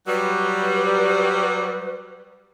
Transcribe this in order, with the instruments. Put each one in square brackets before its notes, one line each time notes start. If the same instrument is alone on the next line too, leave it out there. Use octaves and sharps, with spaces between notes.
[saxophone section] F#3 G3 [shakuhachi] B4